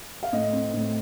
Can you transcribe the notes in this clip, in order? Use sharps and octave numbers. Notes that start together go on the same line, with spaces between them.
F5
A2 D#5
C4
A2